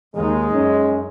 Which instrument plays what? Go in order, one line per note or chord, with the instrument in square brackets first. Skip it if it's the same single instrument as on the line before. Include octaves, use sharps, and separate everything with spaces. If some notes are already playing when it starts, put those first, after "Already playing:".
[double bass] D#2 D#4 [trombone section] G#3
[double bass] F#2 [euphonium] C#4